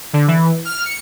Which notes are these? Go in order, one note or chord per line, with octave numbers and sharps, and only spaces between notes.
D3
E3
F6
C#7